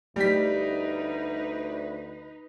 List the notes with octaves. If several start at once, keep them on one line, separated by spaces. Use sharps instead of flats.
D2 G3 A3 D#4 B4 B6